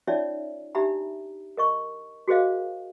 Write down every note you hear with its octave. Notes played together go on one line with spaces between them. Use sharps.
C#4 D#4 F4 C#5 D5 E5
D4 D#4 G4 E5 A#5 B5
A#4 D#5 C#6
F#4 G#4 A#4 C5 D#5 F5